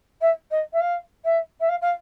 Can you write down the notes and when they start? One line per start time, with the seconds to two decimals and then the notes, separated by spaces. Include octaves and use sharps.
0.21 E5
0.51 D#5
0.73 E5
0.80 F5
1.25 E5
1.60 E5
1.69 F5
1.82 F5